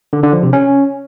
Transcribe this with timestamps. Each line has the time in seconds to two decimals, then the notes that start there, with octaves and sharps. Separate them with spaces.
0.13 D3
0.23 D3
0.33 F3
0.43 C3
0.53 C#4